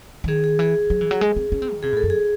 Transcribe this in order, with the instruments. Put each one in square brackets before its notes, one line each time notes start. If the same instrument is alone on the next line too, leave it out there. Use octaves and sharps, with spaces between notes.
[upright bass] E3
[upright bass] D#3 [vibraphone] G#4
[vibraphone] G#4
[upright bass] E3 [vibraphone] G#4
[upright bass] F#3
E3
F#3
G#3
C4
C#4
C4
D#3
[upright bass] C3 [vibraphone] G#4
[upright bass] A2
[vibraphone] A4
[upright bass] F#2
[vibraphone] G#4